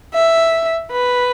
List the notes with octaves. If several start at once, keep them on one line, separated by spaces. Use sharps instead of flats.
E5
B4